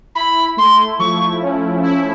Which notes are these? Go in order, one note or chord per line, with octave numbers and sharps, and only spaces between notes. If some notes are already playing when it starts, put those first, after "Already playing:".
E4 B5
A3 C6
F3 C#6
C#4
E4